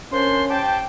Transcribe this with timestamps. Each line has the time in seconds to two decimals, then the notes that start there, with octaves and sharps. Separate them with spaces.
0.12 A#3 C#4 D4 C5 C6
0.49 G4 C5 G5 A5